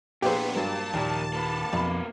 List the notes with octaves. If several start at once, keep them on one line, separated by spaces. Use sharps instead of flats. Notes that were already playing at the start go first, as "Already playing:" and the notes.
A#1 A#2 D3 B3 G4 G#4 C5 C#5
G2 A#2 F#3 A#4 A5
D#2 A#2 F3 A#4
A#3 B4
B1 F2 B5